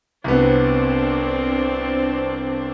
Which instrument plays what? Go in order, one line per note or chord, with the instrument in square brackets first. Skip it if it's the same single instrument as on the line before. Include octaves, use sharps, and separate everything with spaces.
[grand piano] C2 B3 [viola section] C4 D4